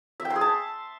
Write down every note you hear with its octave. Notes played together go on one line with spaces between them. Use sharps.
E5
G5
C6
G#4
A5